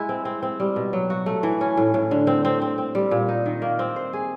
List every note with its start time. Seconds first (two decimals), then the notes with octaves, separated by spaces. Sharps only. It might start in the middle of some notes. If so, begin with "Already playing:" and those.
Already playing: G#3 E4
0.09 C4
0.25 C4
0.43 C4
0.60 G3
0.76 B2
0.93 F#3
1.10 F#4
1.26 A3
1.43 E3
1.61 C#4
1.77 A2
1.94 A2
2.11 D3
2.27 C4
2.45 C4
2.62 C4
2.78 C4
2.95 G3
3.11 A#2
3.29 D#4
3.46 D#3
3.62 A#3
3.79 C4
3.96 C5
4.13 G#4